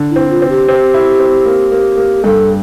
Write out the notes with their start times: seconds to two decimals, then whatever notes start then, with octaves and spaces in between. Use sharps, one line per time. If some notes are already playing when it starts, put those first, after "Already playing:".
Already playing: D3
0.09 E4
0.16 C4
0.29 F4
0.42 C4
0.49 G4
0.69 C4
0.94 E4
1.19 C4
1.46 A#3
1.72 A#3
1.98 A#3
2.23 G2 A4